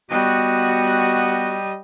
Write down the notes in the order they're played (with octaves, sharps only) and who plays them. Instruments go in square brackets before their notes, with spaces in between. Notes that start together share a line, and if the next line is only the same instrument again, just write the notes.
[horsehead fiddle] G3 D#5 [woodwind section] B3 F#4